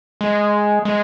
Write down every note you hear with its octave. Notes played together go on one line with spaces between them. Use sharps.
G#3
G#3